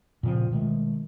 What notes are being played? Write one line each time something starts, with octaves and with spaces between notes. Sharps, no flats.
A#2 C#3 F3 C4
B2 D#3 G#3 A3